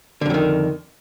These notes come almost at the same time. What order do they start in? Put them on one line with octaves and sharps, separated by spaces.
D3 F2 F#3 D#3